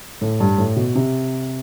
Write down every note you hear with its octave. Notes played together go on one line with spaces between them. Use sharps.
A2
G2
A2
B2
C3